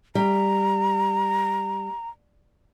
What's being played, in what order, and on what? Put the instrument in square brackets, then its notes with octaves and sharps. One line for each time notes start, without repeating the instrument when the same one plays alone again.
[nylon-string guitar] G3 [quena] A#5